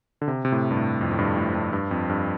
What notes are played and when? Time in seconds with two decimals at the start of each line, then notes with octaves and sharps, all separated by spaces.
0.21 D3
0.28 C3
0.45 C3
0.52 A2
0.71 G2
0.77 A2
1.01 F2
1.12 A2
1.19 G2
1.37 A2
1.55 G2
1.73 G2
1.91 F2
2.09 G2